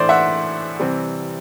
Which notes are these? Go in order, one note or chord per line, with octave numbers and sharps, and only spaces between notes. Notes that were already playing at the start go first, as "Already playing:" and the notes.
Already playing: A2 E3 A3 D4 C5 D5
E5 F#5
C3 E3 G3 C4